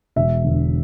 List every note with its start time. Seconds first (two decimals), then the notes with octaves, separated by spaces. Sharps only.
0.16 E1 E5
0.44 E2 D3